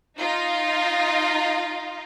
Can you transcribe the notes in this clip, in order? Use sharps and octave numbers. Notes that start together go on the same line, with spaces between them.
D#4 F4